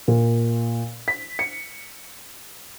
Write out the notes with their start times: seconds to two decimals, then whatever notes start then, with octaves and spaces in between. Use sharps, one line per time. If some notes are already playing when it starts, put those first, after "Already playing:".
0.08 A#2
1.08 B6
1.39 C#7